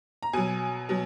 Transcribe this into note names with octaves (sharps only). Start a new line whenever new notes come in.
A#5
B2 F#3 G#5
B2 F#3